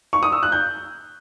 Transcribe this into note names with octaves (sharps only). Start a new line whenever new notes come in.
C#6
D#6
E6
F#6
G6